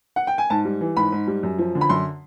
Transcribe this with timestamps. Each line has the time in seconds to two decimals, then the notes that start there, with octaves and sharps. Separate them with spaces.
0.16 F#5
0.27 G5
0.38 G#5
0.50 G#2 A5
0.65 G3
0.81 E3
0.97 G#2 B5
1.12 G#2
1.27 G3
1.43 F#2
1.59 F3
1.75 D3
1.81 B5
1.89 F#2 C6